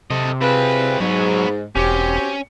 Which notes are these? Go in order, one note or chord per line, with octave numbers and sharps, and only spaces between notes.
C3 A4 D#5
G3 C4 F4 G#4 B4
G#2 F#3 B3 C#5
E1 C4 C#4 F#4 G4